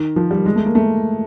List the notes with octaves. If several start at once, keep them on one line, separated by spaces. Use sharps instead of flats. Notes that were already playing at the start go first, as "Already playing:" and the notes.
Already playing: D#3
F3
G3
G#3
A3
A#3
A3